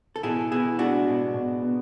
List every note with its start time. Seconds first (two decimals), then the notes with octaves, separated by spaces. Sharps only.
0.16 A4
0.23 B2 E4 G#4
0.51 B3 E4 G#4
0.79 G#3 D4 F#4
1.07 B2
1.34 B2
1.62 B3